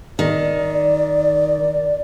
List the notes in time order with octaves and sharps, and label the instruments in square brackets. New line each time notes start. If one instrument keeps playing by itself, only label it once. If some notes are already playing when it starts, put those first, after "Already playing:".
[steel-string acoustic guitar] D#3 [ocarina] D5